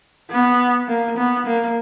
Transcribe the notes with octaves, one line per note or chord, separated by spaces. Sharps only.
B3
A#3
B3
A#3